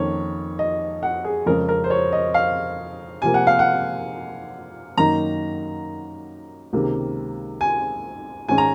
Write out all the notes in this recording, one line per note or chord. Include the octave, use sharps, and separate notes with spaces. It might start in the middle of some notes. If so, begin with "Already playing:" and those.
Already playing: F2 D#3 A#3 C#4 C#5
D#5
F#5
G#4
F2 C#3 G#3 C#4 A#4
A#4
C5
C#5
D#5
F5
C3 F3 A#3 G#5
F#5
F5
F#5
F#2 D#3 A#3 D#4 A#5
C#2 C3 D#3 A#3
G#5
G#2 D#3 G#3 C#4 G#5
A#5